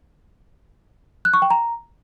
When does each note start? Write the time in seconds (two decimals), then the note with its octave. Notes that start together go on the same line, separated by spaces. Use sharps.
1.25 F#6
1.34 C#6
1.42 G5
1.51 A#5